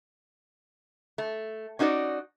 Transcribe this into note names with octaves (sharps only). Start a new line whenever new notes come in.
A3
C#4 D#4 F#4 C5 D5